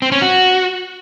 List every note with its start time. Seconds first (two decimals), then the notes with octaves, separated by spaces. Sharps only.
0.02 C4
0.12 C#4
0.22 F#4